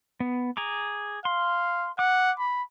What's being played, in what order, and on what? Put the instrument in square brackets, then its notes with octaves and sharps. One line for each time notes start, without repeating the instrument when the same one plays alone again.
[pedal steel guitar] B3
G#4 A#5 D6
[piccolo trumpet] F5 [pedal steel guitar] C6
[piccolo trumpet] F#5 [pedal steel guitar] D6
[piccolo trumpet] B5